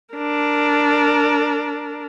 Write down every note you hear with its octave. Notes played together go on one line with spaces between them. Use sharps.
D4 A#4